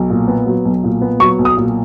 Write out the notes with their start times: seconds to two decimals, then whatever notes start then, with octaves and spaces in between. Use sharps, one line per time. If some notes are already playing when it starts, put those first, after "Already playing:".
Already playing: B1
0.10 A#2
0.28 B3
0.46 F#3
0.65 B1
0.84 A#2
1.02 B3
1.20 F#3 C#6
1.39 B1
1.45 D#6
1.57 A#2